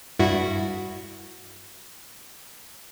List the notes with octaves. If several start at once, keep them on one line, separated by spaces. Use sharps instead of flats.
G2 E4 F#4